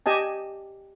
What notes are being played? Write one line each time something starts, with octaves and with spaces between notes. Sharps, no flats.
G4 D#5 G#5 A5